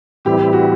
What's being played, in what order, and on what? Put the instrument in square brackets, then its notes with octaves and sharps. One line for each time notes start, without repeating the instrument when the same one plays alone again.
[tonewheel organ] A2 E3 G3 C4 E4 [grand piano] G4
[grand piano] G4
F#4